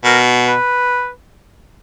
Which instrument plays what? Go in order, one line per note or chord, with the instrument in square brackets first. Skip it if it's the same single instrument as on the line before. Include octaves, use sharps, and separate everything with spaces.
[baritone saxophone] B2 [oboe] A#4
[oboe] B4